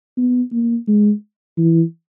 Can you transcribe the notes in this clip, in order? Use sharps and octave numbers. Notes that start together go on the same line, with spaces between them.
B3
A#3
G#3
E3